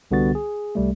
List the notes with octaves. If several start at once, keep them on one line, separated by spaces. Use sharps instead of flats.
C2 D3 G3 B3 F#4 A6
G#4
C2 G3 A3